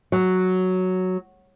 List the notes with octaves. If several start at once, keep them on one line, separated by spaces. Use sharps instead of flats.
F#3